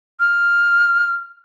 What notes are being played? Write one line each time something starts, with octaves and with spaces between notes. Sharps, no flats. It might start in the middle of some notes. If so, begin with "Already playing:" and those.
F6